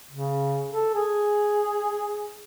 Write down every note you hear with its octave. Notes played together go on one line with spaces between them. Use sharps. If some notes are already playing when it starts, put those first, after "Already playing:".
C#3
A4
G#4